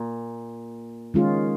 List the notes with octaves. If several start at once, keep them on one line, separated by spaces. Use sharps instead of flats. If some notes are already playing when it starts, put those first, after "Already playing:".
Already playing: A#2
D#3 G#3 C#4 F4 G#4